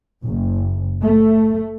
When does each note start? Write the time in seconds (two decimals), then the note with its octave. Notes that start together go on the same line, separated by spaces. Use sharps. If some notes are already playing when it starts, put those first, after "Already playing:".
0.24 F#1
1.02 A3